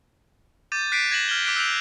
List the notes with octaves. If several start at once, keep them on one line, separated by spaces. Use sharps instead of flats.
D6 G6 A6 D#7
F#6 B6 C7 D7 D#7
G#6 A#6 E7 F#7
F6 G#6 F#7 G7
D6 F#6 B6 D7
E6 F#6 G6 D7 F7